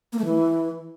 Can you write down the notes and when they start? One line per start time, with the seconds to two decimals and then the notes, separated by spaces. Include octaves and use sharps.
0.13 A#3
0.19 A3
0.25 E3